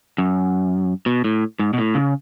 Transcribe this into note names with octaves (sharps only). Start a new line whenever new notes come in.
F#2
B2
A2
G#2
B2
A2
C#3